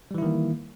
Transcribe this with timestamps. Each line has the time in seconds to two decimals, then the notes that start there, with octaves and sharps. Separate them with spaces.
0.11 G3
0.14 E3
0.18 E4
0.22 D#3
0.26 A#3